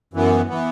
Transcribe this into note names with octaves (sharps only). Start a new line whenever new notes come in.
F#2 E3 B3
E3 B3